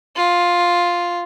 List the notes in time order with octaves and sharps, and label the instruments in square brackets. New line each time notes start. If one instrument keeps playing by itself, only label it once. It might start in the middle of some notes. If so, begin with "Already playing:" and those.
[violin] F4